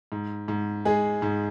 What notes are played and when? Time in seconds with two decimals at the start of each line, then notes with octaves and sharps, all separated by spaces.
0.12 G#2
0.48 G#2
0.85 G#3 G#4
1.22 G#2